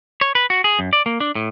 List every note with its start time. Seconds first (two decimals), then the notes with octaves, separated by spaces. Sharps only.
0.21 C#5
0.35 B4
0.50 F#4
0.64 G#4
0.79 F#2
0.93 D5
1.06 A#3
1.20 D4
1.35 A2